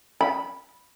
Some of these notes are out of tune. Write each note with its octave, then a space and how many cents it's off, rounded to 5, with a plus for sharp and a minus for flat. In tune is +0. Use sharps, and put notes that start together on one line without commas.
B5 -5